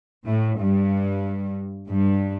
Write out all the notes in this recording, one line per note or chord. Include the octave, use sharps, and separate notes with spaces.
A2
G2
G2